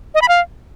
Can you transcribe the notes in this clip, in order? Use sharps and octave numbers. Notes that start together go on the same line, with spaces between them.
D#5
B5
F5